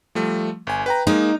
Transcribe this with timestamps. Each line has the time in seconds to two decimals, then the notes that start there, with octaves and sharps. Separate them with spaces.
0.15 F3 G3 A3
0.67 G1 G#5
0.86 B4 G5 A#5
1.07 G#3 A#3 D#4